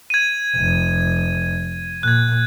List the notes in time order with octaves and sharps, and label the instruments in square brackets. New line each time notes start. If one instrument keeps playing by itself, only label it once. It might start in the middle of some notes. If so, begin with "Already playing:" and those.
[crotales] G#6 D#7
[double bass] F1
[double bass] A#2 [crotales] F#6 G#6